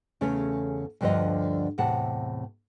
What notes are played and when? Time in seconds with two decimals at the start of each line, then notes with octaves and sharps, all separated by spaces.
0.21 E2 C#3 A3 C#4
1.01 D2 G2 D3 F3 A#4 D#5
1.78 E2 A2 C3 F#5 A5